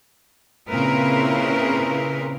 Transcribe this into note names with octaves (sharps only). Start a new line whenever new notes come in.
A#2 C#3 C4 E4 A#4 B4